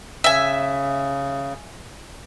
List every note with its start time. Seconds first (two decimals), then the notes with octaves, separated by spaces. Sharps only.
0.24 C#3 E5 G#5